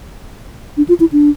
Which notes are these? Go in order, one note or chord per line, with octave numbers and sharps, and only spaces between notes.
D4
F4
E4
D4